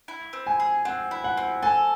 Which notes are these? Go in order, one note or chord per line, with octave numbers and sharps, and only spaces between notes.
E4
C4
G#5
G#4
C4 F#5
E4
F#5
C4
A4 G#5